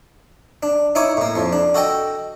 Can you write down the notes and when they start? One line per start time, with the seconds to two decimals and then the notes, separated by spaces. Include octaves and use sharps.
0.63 D4
0.95 D#4 E4 C#5 D6 D#6
1.17 A2 A#3
1.35 F2 F3
1.52 D4
1.74 F#4 A4 D#5 G5